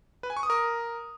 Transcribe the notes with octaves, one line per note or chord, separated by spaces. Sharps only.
B4
G#5
C#6
D#6
A#4